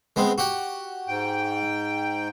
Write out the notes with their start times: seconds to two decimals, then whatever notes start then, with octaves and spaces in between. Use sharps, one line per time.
0.16 G#3 B3 C4
0.38 F#4 G4 F#5
1.08 G#2 G5